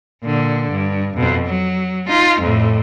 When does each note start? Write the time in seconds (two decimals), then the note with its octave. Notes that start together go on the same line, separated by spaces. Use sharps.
0.24 A#2 D3
0.71 G2
1.16 F2 B2
1.46 F#3
2.08 D#4 F4
2.41 F2 A2